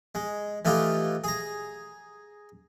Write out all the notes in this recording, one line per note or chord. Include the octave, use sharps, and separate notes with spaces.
G#3
E3 A3 D#4 F4 G4
G#4 A#5